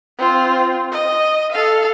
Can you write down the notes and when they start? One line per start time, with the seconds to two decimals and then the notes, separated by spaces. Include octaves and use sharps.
0.18 C4 F4
0.92 D#5
1.52 A4 F5